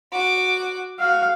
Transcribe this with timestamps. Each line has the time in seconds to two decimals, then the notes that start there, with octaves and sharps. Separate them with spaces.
0.12 F#4 D6
0.99 F#4 F5